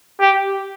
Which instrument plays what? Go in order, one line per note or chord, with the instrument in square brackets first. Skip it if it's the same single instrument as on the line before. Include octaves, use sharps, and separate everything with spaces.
[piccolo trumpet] G4